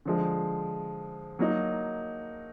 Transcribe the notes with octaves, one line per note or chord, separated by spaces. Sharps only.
D3 F3 G#3
F#3 A#3 D#4